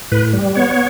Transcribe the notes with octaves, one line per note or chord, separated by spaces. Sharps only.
A2 B4
G3
B3 C#5